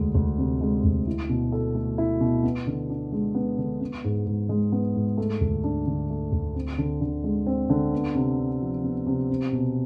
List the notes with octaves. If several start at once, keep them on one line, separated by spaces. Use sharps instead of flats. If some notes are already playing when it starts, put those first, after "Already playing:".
Already playing: D2 G#3
D2
C3
G#3
D2
E4
B2
A4
A3
E4
B2
B3
D3
D4
G#3
B3
D3
B3
G#2
G#2
G#3
B3
G#2
A3
D2
D4
D3
A3
D2
C4
D3
D3
G#3
C4
D3
B3
C3
D4
F3
B3
C3
C4
B2